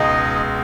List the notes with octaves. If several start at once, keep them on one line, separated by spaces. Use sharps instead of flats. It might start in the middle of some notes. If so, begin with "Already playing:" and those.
Already playing: C#2 B2 G#3 D#4 D#5